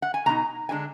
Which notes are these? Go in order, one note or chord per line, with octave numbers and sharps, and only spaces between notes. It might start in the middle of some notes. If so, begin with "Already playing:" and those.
F#5
G#5
B2 G#3 D#4 A#5
D3 G#3 D4 G#5